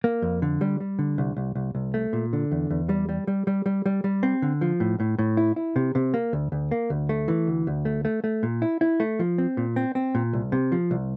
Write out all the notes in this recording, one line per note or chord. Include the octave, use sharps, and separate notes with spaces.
A#3
F2
D3
G3
G3
D3
C2
C2
C2
C2
A3
A#2
D3
E2
E2
G3
G3
G3
G3
G3
G3
G3
C4
D3
F3
A2
A2
A2
E4
E4
C3
C3
A#3
D2
D2
A#3
D2
A3
E3
D2
D2
A3
A3
A3
A#2
E4
E4
A3
F3
C4
A#2
C4
C4
A#2
C2
C3
F3
C2